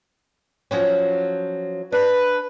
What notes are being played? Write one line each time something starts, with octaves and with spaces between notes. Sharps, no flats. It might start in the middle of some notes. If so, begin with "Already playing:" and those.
F3 F#3 C#4
D4 B4